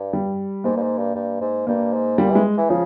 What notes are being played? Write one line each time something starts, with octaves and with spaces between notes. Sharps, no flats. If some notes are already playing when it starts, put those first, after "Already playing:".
Already playing: G2
G3
G#2 A#3
G2
G#2
G2
G2
G#2
G2 A#3
G#2
A#2 G3
E3 G#3
E3
C#3 F3